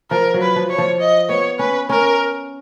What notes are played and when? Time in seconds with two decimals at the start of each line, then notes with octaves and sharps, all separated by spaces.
0.11 F3 A#4
0.34 F#3
0.42 B4
0.56 F3
0.70 C#5
0.78 F3
1.00 D#5
1.29 B3 C#5
1.59 C#4 B4
1.89 C#4 A#4